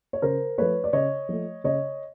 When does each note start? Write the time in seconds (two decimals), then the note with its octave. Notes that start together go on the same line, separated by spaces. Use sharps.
0.13 C#5
0.22 C#3 A#4 C5
0.58 F3 A3 B4 C#5
0.84 D5
0.93 C#3 C#5 D#5
1.29 F3 A3
1.64 C#3 C#5 D#5